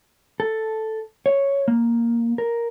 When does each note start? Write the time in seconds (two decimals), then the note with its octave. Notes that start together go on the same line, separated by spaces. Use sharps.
0.40 A4
1.26 C#5
1.68 A#3
2.38 A#4